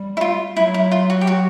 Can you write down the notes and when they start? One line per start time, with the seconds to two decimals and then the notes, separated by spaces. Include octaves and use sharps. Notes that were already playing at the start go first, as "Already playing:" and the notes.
Already playing: G3
0.17 E4
0.21 F4
0.57 F#3 E4
0.74 E4
0.92 F4
1.10 F#4
1.21 G4
1.27 F#4